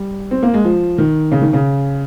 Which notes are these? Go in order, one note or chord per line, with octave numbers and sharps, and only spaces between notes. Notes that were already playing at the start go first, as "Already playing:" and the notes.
Already playing: G3
C4
A#3
G#3
F3
D#3
C#3
D#3
C#3